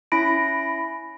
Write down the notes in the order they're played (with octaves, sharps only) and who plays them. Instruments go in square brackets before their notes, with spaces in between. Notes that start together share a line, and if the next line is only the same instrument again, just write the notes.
[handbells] C#4 E4 B5 A#6 D7